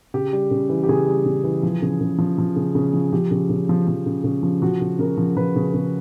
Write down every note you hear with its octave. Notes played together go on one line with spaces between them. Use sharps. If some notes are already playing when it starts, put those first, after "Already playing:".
C#3 G4
G3
C#3
E3
G4
C#3 G#4
G3
C#3
E3
F3
C#3
C#3
F3
F3
C#3
C#3
F3
F3 G4
C#3
C#3
F3
F3
C#3
C#3
F3
F3 F#4
C#3
C#3 A#4
F3
F3 B4
C#3
C#3